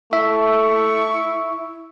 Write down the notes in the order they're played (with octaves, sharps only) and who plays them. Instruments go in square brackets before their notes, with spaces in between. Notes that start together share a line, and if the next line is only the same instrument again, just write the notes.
[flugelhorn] A3 [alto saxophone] E4 [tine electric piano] E5 [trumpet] C#6